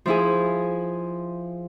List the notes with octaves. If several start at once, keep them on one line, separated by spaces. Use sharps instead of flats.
F3 E4 G#4